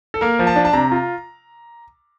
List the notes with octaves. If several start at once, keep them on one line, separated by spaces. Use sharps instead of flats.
A4
A#3 A#4
F3
A5
D4
A5
C3 A#5
F4